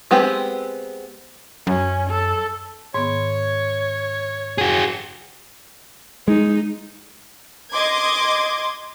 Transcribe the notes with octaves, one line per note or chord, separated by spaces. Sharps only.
G#3 B3 C4 G4
F#2 C#4
A4
G#2 D#3 B3 C#5
F#4 G#4
G#3 D#4
D#5 C6 D6 G#6